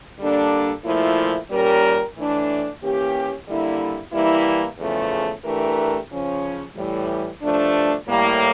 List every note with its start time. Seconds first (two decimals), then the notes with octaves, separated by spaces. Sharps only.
0.19 D3 G3 A#3 D4 A4
0.85 A#2 F3 A3 E4
1.51 A#2 G3 C#4 G4 A#4
2.17 A2 E3 A3 D4
2.82 E3 A#3 C#4 G4
3.47 D3 G3 A#3 E4
4.13 E3 G3 A#3 E4
4.79 E2 C#3 F3 A3
5.45 E3 A3 D4 G4 A#4
6.11 C#3 F3 C#4
6.77 A2 E3 G3
7.42 G2 F3 A3 D4
8.08 A2 G3 A#3